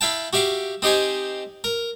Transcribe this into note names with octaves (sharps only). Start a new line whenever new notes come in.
E4 E5 F5 G5 A5
F#4 G4 E5 F5 D6
C4 D#4 G4 C5 G#5
A#4